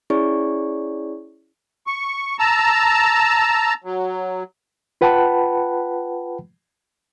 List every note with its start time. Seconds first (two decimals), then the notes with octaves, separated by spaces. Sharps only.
0.10 C#4 E4 G#4 C#5 D5 C#6
1.87 C#6
2.39 A5 A#5 E6
3.84 F#3
5.01 F4 B4 F#5 G5 A5 B5